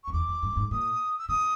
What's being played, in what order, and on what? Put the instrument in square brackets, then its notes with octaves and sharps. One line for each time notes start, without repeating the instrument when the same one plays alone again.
[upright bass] F2 [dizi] C#6
[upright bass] E2 [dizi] D6
[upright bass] F2
G2
G2
G#2
[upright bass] A#2 [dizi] D#6
[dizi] E6
[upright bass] C3 [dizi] D#6